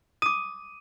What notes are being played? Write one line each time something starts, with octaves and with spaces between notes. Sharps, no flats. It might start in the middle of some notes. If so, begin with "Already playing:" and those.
D6 D#6 D#7